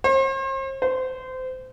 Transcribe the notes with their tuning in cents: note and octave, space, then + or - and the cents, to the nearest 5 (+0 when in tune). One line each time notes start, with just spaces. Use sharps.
C5 +40
C5 -25